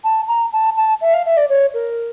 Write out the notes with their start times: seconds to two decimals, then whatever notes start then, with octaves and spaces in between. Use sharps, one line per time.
0.04 A5
0.28 A#5
0.52 A5
0.77 A5
1.01 E5
1.13 F5
1.25 E5
1.37 D5
1.49 C#5
1.73 A#4